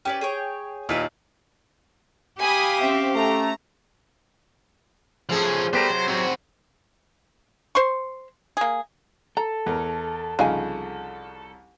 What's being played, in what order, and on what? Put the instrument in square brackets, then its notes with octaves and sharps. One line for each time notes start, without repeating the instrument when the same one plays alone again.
[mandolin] C#4 B4 D5 [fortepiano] G4
[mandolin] G#4 C#5 G5
[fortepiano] D#2 A#2 D#4 [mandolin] E4 B4 D5
[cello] G4 F5 [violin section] G#5 B5 D#6
[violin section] C4 E5 [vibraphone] C#4
[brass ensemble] A3 [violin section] A#5
[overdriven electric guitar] F3 C#4 [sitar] A3 C4 G#4
[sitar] G3 A3 [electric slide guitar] B3 G4 A#4 [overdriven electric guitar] C5
[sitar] C3 [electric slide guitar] F#3
[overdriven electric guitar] C4 F#4
[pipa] C5 C6 C#6
A#3 G#4
[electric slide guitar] A4 [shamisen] A#5
[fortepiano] E2 A#4
[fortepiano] C2 C#3 F3 [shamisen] D#4 F5 G#5